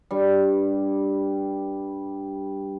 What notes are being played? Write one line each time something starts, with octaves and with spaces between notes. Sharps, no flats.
G2 G3